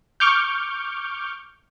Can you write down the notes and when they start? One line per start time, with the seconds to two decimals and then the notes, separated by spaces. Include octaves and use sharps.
0.20 C#6 D6 F6 G6